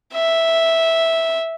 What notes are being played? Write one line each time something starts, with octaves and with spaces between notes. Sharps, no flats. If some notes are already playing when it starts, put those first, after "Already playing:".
E5